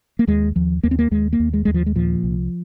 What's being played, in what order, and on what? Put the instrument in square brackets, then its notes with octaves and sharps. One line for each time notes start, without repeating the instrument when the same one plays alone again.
[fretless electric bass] A#3
D#2 G#3
D#2 F3
D#2 A#3
C4
A#3
D#2 G#3
A#3
D#2
G#3
D#2 G#3
F3
G#3
A#2 F3
C2